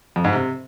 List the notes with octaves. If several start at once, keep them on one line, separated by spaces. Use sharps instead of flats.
F2
G#2
C3